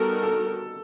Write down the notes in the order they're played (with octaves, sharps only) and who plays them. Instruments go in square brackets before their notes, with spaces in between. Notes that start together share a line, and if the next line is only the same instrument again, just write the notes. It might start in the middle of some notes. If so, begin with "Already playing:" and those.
Already playing: [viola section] G3 B3 D#4 F#4 A#4 [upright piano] A4
[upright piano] A4